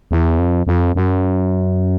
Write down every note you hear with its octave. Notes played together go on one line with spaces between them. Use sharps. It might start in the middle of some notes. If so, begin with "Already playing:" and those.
E2
F2
F2
F#2